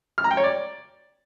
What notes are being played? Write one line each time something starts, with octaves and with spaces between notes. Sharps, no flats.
F6
A#5
G5
C#5
D5